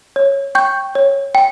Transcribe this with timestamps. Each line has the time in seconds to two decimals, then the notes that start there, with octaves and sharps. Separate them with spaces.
0.16 C#5
0.55 G5 C#6 G6
0.95 C#5
1.35 G5